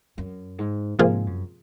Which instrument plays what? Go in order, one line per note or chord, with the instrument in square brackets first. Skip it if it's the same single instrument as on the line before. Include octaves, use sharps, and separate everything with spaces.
[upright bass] F#2
G#2
[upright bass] G#2 [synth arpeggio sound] C3 F3 A#3 F4 G#4
[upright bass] F#2